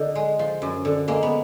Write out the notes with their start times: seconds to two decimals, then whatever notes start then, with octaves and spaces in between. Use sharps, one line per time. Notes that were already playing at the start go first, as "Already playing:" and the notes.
Already playing: D3 D#4
0.15 G#3
0.39 F3
0.62 F#2
0.85 D3
1.08 G#3 A#3
1.23 B3